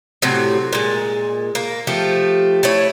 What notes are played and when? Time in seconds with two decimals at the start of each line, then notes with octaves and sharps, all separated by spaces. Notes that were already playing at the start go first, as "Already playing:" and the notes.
0.22 A2 C3 F#3
0.73 A#2 G#3
1.55 A#3
1.87 F3 A3 G4
2.63 A3 E4 C#5